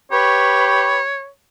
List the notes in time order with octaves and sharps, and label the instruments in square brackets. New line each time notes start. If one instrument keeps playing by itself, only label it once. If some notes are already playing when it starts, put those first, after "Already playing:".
[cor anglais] G4 [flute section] B4 B5 C#6 [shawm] C#5